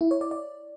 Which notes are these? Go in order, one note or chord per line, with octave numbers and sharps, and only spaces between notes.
E4
C#5
D5
D5